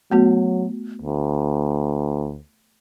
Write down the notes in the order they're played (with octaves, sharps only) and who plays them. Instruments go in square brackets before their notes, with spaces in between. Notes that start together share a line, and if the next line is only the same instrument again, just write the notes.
[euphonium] F#3 [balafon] A3 B3 F#4
[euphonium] D2